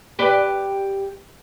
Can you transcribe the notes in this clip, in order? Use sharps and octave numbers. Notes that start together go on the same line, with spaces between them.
G4 B4 D5